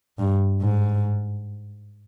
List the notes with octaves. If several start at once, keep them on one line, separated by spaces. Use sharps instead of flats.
G2
G#2